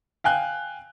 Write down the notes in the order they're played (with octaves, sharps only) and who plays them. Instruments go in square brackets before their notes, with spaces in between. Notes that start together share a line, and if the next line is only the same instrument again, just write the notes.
[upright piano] F5 G5 G#5 F#6